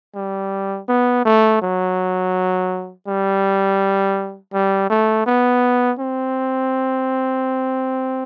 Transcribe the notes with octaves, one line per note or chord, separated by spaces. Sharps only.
G3
B3
A3
F#3
G3
G3
A3
B3
C4